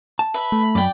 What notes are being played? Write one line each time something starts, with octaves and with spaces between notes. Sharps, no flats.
A5
B4 E5 B5
A3
F#2 D5 G5